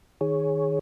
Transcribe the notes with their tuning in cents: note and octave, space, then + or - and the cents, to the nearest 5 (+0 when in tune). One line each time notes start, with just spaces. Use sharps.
D#3 +0 G#4 +0 C#5 +0